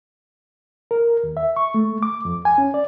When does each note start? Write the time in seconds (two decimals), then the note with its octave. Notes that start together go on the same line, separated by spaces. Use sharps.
0.91 A#4
1.23 D#2
1.37 E5
1.56 C#6
1.74 A3
2.03 D6
2.25 F2
2.45 G#5
2.58 C#4
2.74 D5